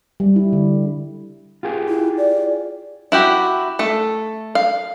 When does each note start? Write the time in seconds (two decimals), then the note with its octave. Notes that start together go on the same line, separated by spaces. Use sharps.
0.20 G3
0.36 E4
0.53 D3
1.63 F4 G4 G#4
1.89 E4
2.18 D5
3.12 E4 F#4 G4
3.79 A3 A4
4.55 F5